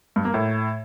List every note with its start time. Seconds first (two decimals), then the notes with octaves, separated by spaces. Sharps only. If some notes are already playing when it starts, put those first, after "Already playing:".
0.16 G2
0.25 A#3
0.34 A2